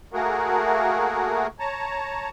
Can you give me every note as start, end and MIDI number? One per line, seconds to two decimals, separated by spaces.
0.13 1.47 57
0.13 1.47 58
0.13 1.47 66
0.13 1.47 68
0.13 1.47 70
1.59 2.29 73
1.59 2.29 81
1.59 2.29 82